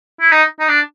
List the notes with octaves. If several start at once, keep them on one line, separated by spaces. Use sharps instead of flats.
E4
D#4
D#4
D4